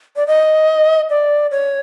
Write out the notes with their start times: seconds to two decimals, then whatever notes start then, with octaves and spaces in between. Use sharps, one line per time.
0.16 D5
0.27 D#5
1.10 D5
1.51 C#5